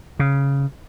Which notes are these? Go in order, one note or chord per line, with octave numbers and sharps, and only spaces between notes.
C#3